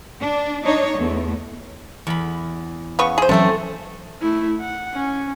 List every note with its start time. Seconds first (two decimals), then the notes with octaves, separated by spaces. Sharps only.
0.20 D4
0.63 D4 D#4 C#5
0.97 E2 A3
2.07 E2 B5
2.99 C#3 B3 C#6
3.18 G#4 C5
3.29 C3 E3 F#3 A3 C4 C#4 A4
4.22 A3 E4
4.61 F#5
4.94 C#4